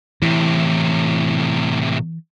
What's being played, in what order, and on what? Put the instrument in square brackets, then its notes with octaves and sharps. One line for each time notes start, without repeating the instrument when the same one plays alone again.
[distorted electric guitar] A2 C3 [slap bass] E3